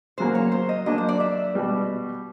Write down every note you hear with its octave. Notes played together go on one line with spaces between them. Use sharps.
C#3 F#3 A#3 C5
C#5
C5
D#5
F#3 A#3 D4 D#5
C5
D5
E5
B2 G3 B3